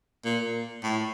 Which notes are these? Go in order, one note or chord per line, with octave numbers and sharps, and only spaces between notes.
A#2
A2